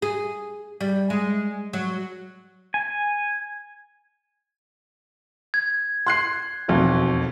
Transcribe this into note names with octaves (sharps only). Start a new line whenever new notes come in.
G#4
G3
G#3
F#3
G#5
G#6
C6 F#6 C7
E1 B1 F2